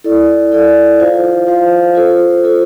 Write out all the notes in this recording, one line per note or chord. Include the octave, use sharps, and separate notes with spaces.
E4 A4 D5
E4 A4 D5
F4 C5 F5
F4 C5 F5
F4 A4 C5
F4 A4 C5